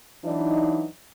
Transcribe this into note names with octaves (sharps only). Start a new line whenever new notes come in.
E3 F#3 D4 D#4